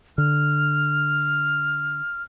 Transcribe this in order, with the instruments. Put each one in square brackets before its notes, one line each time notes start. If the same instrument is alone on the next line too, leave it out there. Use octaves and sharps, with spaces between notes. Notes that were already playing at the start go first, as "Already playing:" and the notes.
[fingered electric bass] D3 [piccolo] F6